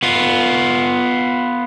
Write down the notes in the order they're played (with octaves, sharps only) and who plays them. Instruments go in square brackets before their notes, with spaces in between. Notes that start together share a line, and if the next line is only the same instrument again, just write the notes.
[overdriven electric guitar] B3 F4